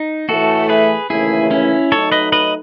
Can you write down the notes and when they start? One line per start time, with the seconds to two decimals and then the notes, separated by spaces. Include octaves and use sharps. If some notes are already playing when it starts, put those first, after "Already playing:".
Already playing: D#4
0.29 A2 E3 A3 F#4 A4
0.69 G#4 B4
1.10 D#2 C#3 E3 A3 E4 G#4
1.51 C#4 E4
1.91 F#3 A3 D#4 A4 C#5
2.12 B4 D#5
2.32 B4 D#5